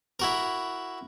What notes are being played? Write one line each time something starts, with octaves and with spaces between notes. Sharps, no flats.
E4 F#4 A#4